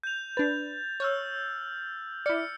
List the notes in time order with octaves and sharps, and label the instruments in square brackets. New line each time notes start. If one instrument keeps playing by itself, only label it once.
[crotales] G6 F7
[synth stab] D4 B4 [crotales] A6
[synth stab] C#5 [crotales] E6 F6 G6
[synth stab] E4 D5 [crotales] F6 C#7